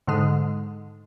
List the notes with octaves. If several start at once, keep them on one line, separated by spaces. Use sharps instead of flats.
G#2 D3 G#3